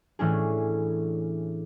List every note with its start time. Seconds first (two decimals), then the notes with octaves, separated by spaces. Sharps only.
0.19 A2 E3 C#4 D4 G#4